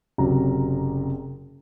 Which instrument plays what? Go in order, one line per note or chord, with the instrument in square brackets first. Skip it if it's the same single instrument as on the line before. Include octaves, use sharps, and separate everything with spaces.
[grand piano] F#1 C3 F#3 A#5